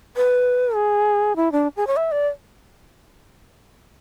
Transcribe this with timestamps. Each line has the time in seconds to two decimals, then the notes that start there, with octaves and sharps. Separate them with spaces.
0.17 B4
0.76 G#4
1.36 E4
1.52 D4
1.77 G#4
1.87 C#5
1.97 E5
2.12 D5